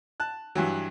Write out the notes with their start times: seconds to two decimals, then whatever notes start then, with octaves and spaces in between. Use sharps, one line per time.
0.20 A5 F#6
0.55 G2 E3 F#3